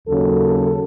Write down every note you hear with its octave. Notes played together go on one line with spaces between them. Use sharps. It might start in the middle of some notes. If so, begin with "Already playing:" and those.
D#2 C#3 F#3 A4